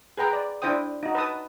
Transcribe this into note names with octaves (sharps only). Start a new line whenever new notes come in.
G#4 B4 G5 A#5
D5
D4 E4 C5 G5 D#6
D#4 F#4
B4 A5 D#6